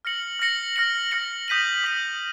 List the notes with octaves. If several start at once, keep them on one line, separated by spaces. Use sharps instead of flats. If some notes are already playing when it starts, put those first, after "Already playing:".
F6 A#6 C#7 F#7
F6 A#6 C#7 F#7
F6 A#6 C#7 F#7
F6 A#6 C#7 F#7
D#6 G6 B6 D#7 F#7
D#6 G6 B6 D#7 F#7